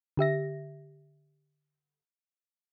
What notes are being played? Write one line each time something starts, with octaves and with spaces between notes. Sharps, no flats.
D3 G4 E5 A#6